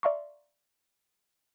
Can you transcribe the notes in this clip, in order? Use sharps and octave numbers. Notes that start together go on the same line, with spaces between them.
D5 E5 F5 A#5 C6 C#6